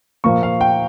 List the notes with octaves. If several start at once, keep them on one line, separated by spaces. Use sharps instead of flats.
A#2 F3 A#3 C#6
F5
G5